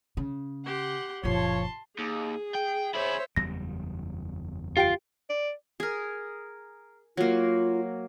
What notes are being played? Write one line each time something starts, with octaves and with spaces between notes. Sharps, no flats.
C#3
G4 F#5 C6
F#1 A#2 F3 C#5 A5 C6
D#2 G#4
G5
E4 G#4 C5 C#5 E5
F#1 E2 G3 A#6
F4 G4 G5 D7
D5
G#4 A#4
F#3 A#3 F4